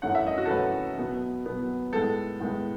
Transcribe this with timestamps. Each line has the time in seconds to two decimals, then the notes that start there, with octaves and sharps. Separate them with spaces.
0.02 F#2 E3 A3 C#4 F#5
0.15 E5
0.27 D#5
0.38 F#4
0.45 A4
0.50 F#2 E3 A3 C#4 B4
0.98 B2 F#3 B3
1.46 B2 F#3 B3
1.93 A2 G#3 B3 A4
2.40 A2 G#3 B3